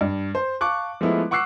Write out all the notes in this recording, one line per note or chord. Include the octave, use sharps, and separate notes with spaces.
G2
C5
F5 A5 C#6 D6 F#6
F3 G#3 A3 B3 E4
F#5 C#6 D6 E6 F#6 C7